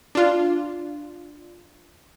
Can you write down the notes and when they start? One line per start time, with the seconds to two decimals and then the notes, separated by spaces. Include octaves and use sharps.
0.15 D4 F4